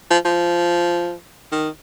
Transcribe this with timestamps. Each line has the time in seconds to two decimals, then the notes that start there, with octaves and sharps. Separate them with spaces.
0.11 F3
0.25 F3
1.52 D#3